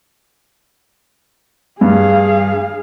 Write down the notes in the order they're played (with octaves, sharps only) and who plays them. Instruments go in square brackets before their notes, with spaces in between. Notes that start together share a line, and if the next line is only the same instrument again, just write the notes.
[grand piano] G2 [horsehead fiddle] G#4 F5